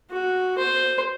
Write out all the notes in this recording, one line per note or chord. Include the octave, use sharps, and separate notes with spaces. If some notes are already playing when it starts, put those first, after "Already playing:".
F#4
C5